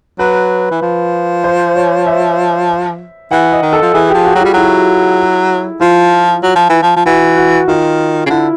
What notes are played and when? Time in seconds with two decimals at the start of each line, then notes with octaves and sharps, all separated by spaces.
0.19 F#3 B4
0.71 E3
0.82 F3
1.44 C5
1.76 C#5
2.06 E5
3.31 E3 F#5
3.52 D#5
3.62 D#3
3.73 A4
3.82 F3
3.94 E3 G#4
4.09 F3 G4
4.25 F#4
4.35 F#3
4.41 G3 F4
4.54 F#3 E4
5.81 F3 F4
6.43 F#3
6.55 F3
6.69 E3
6.82 F3
6.96 F3
7.06 E3 F#4
7.37 F#4
7.68 D#3 F4
8.26 C#3
8.30 D3 E4